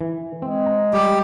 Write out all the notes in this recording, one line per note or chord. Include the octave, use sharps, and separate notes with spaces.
E3
G#3 C4
A#5
G3 G4